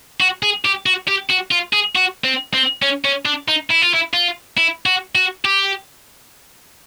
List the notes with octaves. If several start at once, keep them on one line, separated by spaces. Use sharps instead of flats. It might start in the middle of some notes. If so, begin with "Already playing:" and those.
F#4
G#4
G4
F#4
G4
F#4
F4
G#4
F#4
C4
C4
C#4
C#4
D4
D#4
E4
F4
E4
F4
E4
F#4
F#4
G4